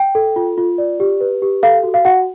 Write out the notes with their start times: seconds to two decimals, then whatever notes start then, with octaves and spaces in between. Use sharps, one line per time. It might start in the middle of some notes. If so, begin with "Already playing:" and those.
Already playing: G5
0.15 A4
0.36 F4
0.58 F4
0.78 D5
1.00 G4
1.21 B4
1.42 G4
1.63 A4 F5
1.83 F#4
1.94 F5
2.05 F#4 F#5